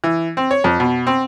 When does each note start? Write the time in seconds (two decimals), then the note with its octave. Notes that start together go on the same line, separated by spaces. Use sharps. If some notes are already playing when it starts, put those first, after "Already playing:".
0.04 E3
0.37 C4
0.51 C#5
0.64 F2
0.80 B2
1.07 C4